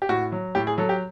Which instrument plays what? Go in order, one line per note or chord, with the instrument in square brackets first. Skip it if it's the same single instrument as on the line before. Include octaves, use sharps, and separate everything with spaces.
[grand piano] G4
A2 F#4
F#3
A2 G4
G#4
F#3 A4
G4